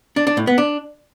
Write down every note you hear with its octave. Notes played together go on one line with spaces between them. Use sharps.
D4
D4
A2
B3
D4